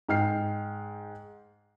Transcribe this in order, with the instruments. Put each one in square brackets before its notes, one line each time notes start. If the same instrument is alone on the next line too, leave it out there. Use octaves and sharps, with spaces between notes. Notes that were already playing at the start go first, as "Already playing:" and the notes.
[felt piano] G#2 G5 F6 C7